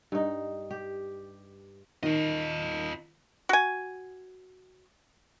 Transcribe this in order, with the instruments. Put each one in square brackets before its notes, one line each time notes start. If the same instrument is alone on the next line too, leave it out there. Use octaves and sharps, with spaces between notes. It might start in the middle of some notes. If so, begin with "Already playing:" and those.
[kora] G2 D#4
G4
[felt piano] D#3 [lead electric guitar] F4 D#5
[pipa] F#4 G#5